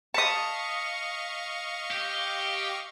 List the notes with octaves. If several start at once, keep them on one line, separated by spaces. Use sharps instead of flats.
D#5 F5 A5 C#6 D#6 B6 C#7
G4